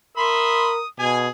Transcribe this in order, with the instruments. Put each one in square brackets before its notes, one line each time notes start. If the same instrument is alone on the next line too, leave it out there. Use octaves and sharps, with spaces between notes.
[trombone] A#4 [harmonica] E5 B5 C6 [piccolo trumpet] D#6
[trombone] B2 [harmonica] G#4 [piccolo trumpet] G#5